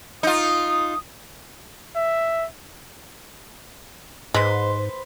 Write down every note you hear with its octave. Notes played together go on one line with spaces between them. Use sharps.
D#4 F4 D#6
E5
G#2 G#3 B4 C5